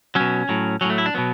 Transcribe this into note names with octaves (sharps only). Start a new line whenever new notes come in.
B2 F#3 C#4
A2 F#3
A2 F#3 C#4
A3
E4
D4
B2 F#3 B3